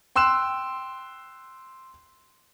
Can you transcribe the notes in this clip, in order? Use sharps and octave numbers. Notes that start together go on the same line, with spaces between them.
G5 C6 E6 F#6 E7